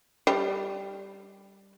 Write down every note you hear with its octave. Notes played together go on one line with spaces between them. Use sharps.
G3